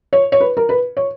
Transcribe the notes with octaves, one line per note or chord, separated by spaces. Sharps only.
C#5
C#5
B4
A#4
B4
C#5